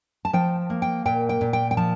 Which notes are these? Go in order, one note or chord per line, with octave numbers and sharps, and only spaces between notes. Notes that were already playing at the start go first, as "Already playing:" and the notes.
A5
F3 G5
A#3
G5
A#2 G5
G5
A#2
G5
G5
F3 A5